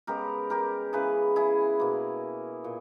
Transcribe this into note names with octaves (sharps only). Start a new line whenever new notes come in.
C#3 G#3 B3 G4 A#4
G4 A#4
C#3 E3 G#3 G#4 B4
E4 G#4
B2 A#3
A#2